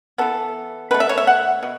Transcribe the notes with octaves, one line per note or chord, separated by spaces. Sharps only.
E3 B3 A4
B2 A3 B4
E5
C#5
E5
F#5
B2